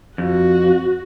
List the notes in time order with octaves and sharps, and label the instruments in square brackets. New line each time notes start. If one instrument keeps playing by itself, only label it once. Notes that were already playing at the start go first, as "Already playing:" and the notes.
[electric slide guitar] F2 [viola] F#4